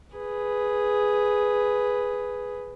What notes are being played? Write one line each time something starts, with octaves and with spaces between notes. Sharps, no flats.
G#4 B4